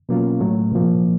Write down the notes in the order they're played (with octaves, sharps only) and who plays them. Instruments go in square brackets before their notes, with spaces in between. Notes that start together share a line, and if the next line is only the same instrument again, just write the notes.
[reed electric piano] B2 F#3 A#3 C#4 F4
A2 F#3 A3
C2 A#2 F3 A#3